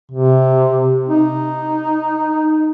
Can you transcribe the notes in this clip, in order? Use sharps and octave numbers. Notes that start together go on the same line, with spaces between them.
C3
D#4